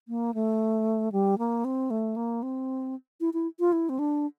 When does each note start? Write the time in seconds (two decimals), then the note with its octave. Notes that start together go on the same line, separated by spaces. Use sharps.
0.08 A#3
0.34 A3
1.12 G3
1.38 A#3
1.64 C4
1.90 A3
2.16 A#3
2.43 C4
3.20 E4
3.34 E4
3.60 F4
3.72 E4
3.89 C4
3.99 D4